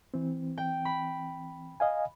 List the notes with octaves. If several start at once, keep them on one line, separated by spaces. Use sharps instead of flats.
E3 C4
G5
B5
D#5 F5 G#5